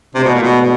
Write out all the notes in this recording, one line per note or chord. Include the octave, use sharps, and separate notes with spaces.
G#2 C3 E3 A3 D4
B2
A#2
B2
B2